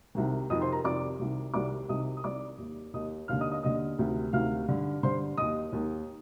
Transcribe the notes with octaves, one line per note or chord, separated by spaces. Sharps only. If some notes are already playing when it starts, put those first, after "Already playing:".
C2 C3 D#3
F2 C3 D#3 D#5 D#6
C5 C6
A#4 A#5
F2 C3 D#3 D5 D6
C2 C3 D#3
C2 C3 D#3 D5 D6
C2 C3 D#3 D#5 D#6
D#6
C2 C3 D#3 D5 D6
D#2 D#3
D#2 D#3 D#5 D#6
D#2 D3 F5 F6
D#5 D#6
D#5 D#6
D#2 D3 D#5 D#6
D2 C3 D#3
D2 C3 D#3 F5 F6
G2 D3
G2 D3 C5 C6
D#2 D#3 D#5 D#6
D#2 D#3